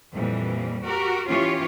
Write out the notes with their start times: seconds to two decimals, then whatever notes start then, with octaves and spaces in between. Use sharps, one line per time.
0.14 F2 A#2 E3 G3
0.85 F#4 G4 A#4
1.27 E3 C#4 F4 G4 C#5